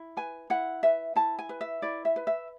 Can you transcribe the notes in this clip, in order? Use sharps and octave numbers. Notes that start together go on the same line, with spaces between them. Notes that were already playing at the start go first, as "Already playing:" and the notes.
Already playing: E4
B4 G#5
E4 F#5
B4 E5
E4 A5
G#5
B4
E5
E4 D5
E5
B4
E5